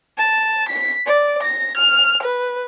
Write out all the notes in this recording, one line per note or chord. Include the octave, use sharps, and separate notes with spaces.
A5
B6
D5
A#6
F6
B4